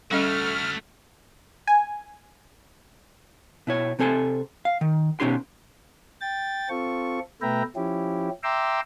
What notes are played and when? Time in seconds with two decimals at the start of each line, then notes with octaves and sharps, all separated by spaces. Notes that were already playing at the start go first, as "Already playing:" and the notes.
0.11 G3 A3 C#4 F#4 A4 D#5 F6
1.67 G#5
3.67 B2 E4 C#5
3.99 C3 C4 A4 G#5 C6
4.65 F5
4.81 D#3
5.20 B2 D#3 C#4 D#4 G4 C6
6.21 G5 A6
6.69 C4 F4 A4 C#6
7.42 B2 A3 B4 E5 G5 A#5
7.76 F3 C#4 E4 G4
8.43 E5 G5 A#5 C6 D6 E6